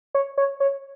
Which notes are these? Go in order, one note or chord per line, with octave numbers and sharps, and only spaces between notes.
C#5
C#5
C#5